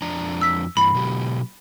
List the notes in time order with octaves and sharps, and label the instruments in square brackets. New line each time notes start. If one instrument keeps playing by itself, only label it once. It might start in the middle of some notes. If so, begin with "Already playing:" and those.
[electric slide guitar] F2 D4 A#5
[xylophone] E6 B6
[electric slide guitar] G2 E3 [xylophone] B5
[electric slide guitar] B2 F#3 G4